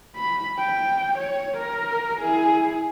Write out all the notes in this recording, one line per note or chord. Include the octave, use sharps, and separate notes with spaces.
B5
G5
C#5
A#4
E4 G#4